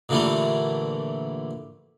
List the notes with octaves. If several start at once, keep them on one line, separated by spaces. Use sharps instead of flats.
A#2 D3 E3 G3 A3